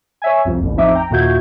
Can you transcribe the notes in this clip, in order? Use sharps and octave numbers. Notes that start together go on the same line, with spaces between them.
C#5 E5 G#5
C2 F2
A1 D#2
A1 F2 F3 D#4 E5 D6
G5 A#5
D#2 A#2 F#4 E5 G6 G#6